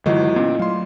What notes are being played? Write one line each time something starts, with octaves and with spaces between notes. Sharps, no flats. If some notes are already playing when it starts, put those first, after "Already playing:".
G1 D3 E3 F#3 G#3 E4 F4 D#5
A#2 B3 C#4
F#3 A3 F5 C6